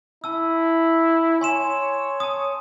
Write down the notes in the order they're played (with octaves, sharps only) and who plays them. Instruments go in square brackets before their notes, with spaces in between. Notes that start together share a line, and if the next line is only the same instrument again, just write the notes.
[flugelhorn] E4 [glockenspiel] A5 E6
[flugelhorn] C#5 [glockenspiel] G#5 C6 E7
[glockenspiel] A5 D#6